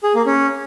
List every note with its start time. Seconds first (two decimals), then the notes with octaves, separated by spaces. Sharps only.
0.03 G#4
0.15 A#3
0.26 C#4